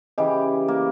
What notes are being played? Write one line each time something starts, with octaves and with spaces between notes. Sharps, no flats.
C#3 E3 G4 D#5
A#3